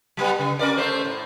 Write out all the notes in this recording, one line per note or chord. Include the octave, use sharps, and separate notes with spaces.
F#3 G3 B3
C#3
C#4 A#4 D5
A3 C5
A2